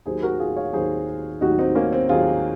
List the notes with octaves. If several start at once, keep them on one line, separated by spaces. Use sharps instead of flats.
D#2 D#3 F#3 G#4 C5
F#4 A#4
F4 G#4
C#5 F5
D#2 D#3 F#3 G#4 C5
D#2 D#3 F#3 D#4 F#4
C4 D#4
A#3 C#4
C4
D#2 D#3 F#3 F4 G#4